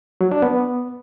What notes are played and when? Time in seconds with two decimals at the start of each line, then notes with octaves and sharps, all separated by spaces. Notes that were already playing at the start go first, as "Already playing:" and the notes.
0.21 F#3
0.31 D4
0.42 B3